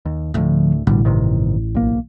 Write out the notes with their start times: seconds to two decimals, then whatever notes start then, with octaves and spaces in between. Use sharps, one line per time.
0.05 D#2
0.34 D2 A2 D3 F3
0.87 A1 B2 D3 G3
1.05 G2 C3 D#3
1.75 B1 A#3